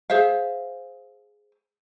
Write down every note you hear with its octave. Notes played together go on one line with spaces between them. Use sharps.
G#4 C5 E5 F5